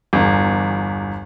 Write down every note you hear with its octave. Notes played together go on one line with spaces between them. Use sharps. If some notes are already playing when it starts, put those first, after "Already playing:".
G1 E2